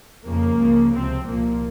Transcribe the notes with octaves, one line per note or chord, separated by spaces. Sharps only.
F2 C#3 F3 A#3
C#2 C#3 F3
C#2 C3 F3 C4
C2 A#2 F3 A#3